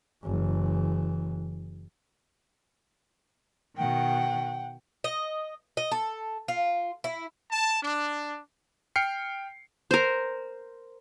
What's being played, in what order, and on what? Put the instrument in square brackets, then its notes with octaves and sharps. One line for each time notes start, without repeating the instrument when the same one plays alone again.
[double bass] F#1 E3
[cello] B2 D#3 [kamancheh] F#5 G5
[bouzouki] D#5
D#5
A4
F4
E4
[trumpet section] A5
D4
[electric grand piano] G5 F6 C7 C#7
[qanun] A#4 C5